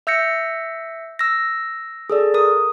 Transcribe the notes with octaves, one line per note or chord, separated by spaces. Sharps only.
E5 E6 G6 A#6 C#7
E6 A#6
G#4 A4 D5
A#4 D#6